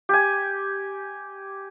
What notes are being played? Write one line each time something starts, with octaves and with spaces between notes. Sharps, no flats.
G4 G#5